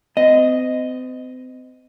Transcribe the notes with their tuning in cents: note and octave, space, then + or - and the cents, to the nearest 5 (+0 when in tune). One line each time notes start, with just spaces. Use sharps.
C4 -40 D#5 +0